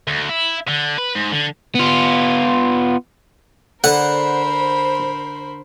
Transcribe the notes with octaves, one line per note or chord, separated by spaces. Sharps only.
D2
E4
D3
B4
G#2
D3
B3 F4
D3 A#4 C5 F#5 B5